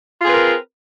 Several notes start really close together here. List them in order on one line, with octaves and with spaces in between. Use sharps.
F4 G#4 C4 B4 A#4